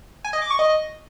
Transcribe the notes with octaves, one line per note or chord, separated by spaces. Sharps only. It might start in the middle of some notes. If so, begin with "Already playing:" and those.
G#5
D#5
D6
C#6
D#5